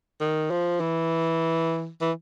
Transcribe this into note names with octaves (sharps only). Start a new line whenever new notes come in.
D#3
F3
E3
E3